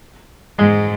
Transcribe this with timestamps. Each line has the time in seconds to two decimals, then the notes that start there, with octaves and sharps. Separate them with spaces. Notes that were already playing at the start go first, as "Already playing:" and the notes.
0.59 G#2 G#3